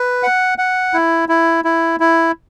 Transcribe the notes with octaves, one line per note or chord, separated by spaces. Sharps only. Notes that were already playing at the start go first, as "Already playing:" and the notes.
Already playing: B4
F#5
F#5
E4
E4
E4
E4